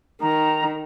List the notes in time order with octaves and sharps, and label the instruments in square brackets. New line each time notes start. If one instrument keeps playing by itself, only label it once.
[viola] D#3 [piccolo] A#5